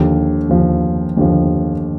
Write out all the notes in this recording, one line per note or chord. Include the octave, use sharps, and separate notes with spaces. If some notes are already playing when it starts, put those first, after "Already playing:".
Already playing: D#2 D3 F3
D#2 D3 F3
D#2 D3 F3